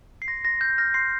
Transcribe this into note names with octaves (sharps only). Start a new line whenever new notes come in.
C7
C6 A#6
C6 A#6
F6 G6
F6 A#6
C6 C7